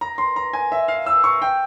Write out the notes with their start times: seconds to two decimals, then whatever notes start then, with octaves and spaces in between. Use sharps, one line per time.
0.01 A#5
0.18 C6
0.36 A#5
0.53 G#5
0.72 E5
0.88 F5
1.06 E6
1.24 C#6
1.42 G5